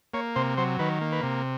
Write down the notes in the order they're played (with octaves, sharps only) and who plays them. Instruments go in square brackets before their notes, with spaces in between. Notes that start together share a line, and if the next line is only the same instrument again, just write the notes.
[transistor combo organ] A#3 C#5
C3 C5
F#3 C5
D#3 B4
A#3
B4
C3